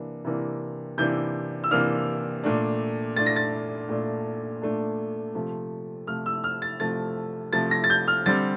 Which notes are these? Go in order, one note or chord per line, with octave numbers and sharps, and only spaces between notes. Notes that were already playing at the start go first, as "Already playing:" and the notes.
Already playing: C3 E3 A#3 D4
C3 E3 A#3 D4
C3 E3 A#3 D4 G6
E6
C3 E3 A#3 D4 F6
A#2 A3 D4
A#2 A3 D4 A6
A#6
A6
A#2 A3 D4
A#2 A3 D4
C3 F3 A3
C3 F3 A3 F6
E6
F6
A6
C3 F3 A3 A6
C3 F3 A3 A6
A#6
A6
G6
F6
D3 G3 C4 A6